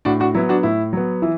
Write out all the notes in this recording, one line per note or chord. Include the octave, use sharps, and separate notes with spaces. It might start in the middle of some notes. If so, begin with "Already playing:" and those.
A2 D4 F#4
D4 F#4
F#3 B3 E4
D4 F#4
A2 E4
F#3 B3
E3 E4